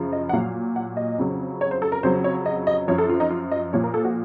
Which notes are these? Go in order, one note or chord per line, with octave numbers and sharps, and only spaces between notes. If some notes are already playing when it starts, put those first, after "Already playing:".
Already playing: F#2 C#3 F3
D#5
F#5
A#2 F#3 F5
F#5
D#5
F2 C#3 F#3
C#5
C5
A4
A#4
F2 C#3 F#3 C5
C#5
D#5
D#5
F#2 F3 C#5
A4
F4
D#4
F4
D#5
A#2 F3 C#5
A#4
A4
F#4